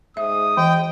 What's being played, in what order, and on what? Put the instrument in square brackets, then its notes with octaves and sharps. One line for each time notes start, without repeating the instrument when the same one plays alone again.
[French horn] G#2 [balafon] E5 [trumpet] D#6
[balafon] E3 [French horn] D#5 [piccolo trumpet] G5